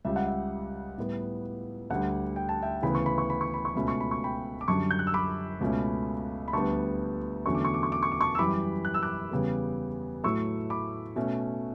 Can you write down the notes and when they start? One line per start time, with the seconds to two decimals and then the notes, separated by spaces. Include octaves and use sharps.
0.05 C#2 C#3 G3 E5
0.16 F#5
0.27 E5
0.98 A2 G3 B3
1.90 D2 D3 G3 F#5
2.36 G5
2.49 A5
2.62 E5 G5
2.82 D2 C#3 E3 B3 B5
2.95 C#6
3.06 B5
3.18 C#6
3.30 B5
3.41 C#6
3.54 B5
3.65 C#6
3.75 C#2 B2 A3 C#4 B5
3.88 C#6
4.01 B5
4.11 C#6
4.24 G5 B5
4.61 D6
4.68 F#2 D3 G3 A5 C#6
4.90 G6
4.99 F#6
5.07 E6
5.14 B5 D6
5.61 C#2 B2 A3 C#4
6.48 B5
6.53 D2 D3 G3 B3 A5 C#6
7.46 E2 D3 F#3 A3 C#4 C#6
7.55 D6
7.65 C#6
7.74 D6
7.83 C#6
7.92 D6
8.03 C#6
8.12 D6
8.21 A5 C#6
8.35 E6
8.39 F#2 E3 G3 B5 D6
8.85 F#6
8.94 E6
9.02 D6 F#6
9.31 E2 C#3 G3 B3
10.24 A2 F#3 A3 C#6 E6
10.70 B5 D6
11.16 B2 A3 C#4